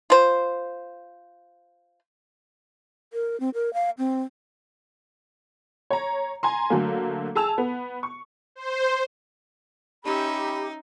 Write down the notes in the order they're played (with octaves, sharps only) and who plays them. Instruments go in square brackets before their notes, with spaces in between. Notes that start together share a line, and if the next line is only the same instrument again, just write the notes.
[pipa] F4 C5
[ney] A#4
C4
A#4
F5
C4
[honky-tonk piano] C#5 A#5
G#5 A#5 C6
D3 F#3 A3 A#3
G#4 A5 E6 F7
B3
C#6
[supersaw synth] C5
[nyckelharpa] C#4 E5 [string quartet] D#4 [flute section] G4 [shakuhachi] B5